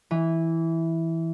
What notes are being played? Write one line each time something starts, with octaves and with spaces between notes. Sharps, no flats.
E3